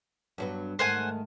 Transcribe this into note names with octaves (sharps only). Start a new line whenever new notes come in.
G2 F#3 B3
G#2 D#3 A3 C5 F#5 G#5